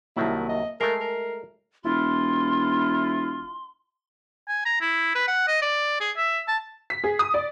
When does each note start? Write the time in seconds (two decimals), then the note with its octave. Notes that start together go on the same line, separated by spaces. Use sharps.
0.17 C2 D#3 F#3 A#3 E4 E5 A5
0.49 D#5
0.81 G#3 A3 A#4 C7
1.01 A#4
1.84 E1 E4 F4 C6
4.49 G#5
4.65 A#5
4.81 E4
5.16 B4
5.28 F#5
5.48 D#5
5.62 D5
6.00 G#4
6.17 E5
6.48 A5
6.90 B6
7.04 G#4
7.19 D#6
7.34 D5